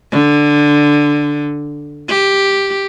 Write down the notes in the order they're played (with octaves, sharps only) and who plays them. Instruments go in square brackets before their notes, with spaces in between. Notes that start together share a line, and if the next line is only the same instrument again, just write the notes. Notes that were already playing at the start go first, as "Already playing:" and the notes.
[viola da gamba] D3
G4